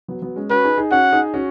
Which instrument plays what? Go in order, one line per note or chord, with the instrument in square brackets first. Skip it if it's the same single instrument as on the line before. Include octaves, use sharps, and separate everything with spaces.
[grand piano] F#3 B3
F#3 B3
G#3 C#4
[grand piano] C#4 F#4 [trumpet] B4
[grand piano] D#4 G#4
D#4 G#4
[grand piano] C#4 F#4 [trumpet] F#5
[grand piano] D#4 G#4
C#4 F#4